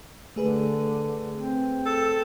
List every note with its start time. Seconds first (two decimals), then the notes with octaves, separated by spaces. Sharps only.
0.36 D3 A3 G#4 B4
1.34 C4
1.86 A4